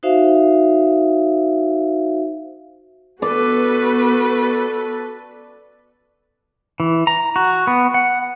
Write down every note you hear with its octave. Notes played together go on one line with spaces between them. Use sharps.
D#4 F#4 C5 E5 F5
B3 F#4 A4 B4 D5
E3
A#5
F#4
B3
F#5